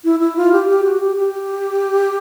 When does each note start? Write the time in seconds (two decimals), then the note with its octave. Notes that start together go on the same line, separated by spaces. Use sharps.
0.05 E4
0.20 E4
0.37 F4
0.52 G4
0.68 G4
0.84 F#4
1.00 G4
1.17 G4